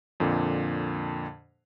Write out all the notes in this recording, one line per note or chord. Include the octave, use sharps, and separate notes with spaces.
F2 A#2 D3